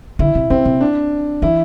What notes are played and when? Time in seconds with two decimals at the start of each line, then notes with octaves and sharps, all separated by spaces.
0.19 D3 E4
0.35 C3
0.50 C3 C4
0.65 C3
0.81 D4
1.42 E3 E4